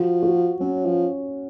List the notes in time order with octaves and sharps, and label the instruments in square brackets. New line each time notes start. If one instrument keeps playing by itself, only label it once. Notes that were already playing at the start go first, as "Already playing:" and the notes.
Already playing: [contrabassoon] F3 [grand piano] F#4
[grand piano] F#4
[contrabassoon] F#3 [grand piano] C#4
[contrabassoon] F3